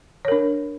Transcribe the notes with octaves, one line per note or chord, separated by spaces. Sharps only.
D4 A#4 C#5